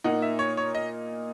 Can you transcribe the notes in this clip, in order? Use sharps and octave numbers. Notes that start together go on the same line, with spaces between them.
A#2 A#3 D#4 F#5
E5
C#5
C#5
D#5